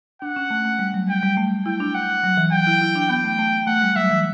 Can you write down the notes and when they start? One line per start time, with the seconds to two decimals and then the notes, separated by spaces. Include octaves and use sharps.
0.22 D4 F#5
0.36 C#4
0.50 A3
0.65 A3
0.79 G3
0.94 F#3
1.09 G3 G5
1.23 G3
1.37 A3
1.66 E4 G5
1.80 D4
1.94 F#5
2.24 F#3
2.37 E3
2.52 F#3 G5
2.67 E4
2.81 E4
2.95 D4
3.10 B3 G5
3.24 A3
3.39 A3
3.67 A3 F#5
3.82 G3
3.96 F#3 E5
4.11 E3